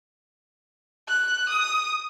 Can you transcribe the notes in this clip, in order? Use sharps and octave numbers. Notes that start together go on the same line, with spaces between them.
F#6
D#6